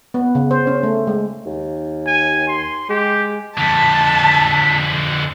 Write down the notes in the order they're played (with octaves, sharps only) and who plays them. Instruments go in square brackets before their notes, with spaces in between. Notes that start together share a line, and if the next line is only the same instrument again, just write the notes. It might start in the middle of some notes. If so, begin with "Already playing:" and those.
[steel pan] B3
C#3
C5
C#4
A3
G#3
[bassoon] D#2
[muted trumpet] G#5
C6
[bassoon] G#3 [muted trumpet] G4
[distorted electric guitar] F2 D3 [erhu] A5 [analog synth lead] B6